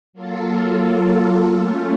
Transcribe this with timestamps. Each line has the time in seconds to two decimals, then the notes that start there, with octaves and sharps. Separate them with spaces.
0.13 F#3 A#3 F4 A4
1.45 A3 C#4 F4